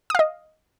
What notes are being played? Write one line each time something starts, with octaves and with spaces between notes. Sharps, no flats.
D#5 F5 D#6